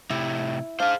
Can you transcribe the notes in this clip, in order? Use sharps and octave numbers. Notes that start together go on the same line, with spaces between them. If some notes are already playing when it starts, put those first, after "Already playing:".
A2 C3 E4
D4 G#4 C5 F5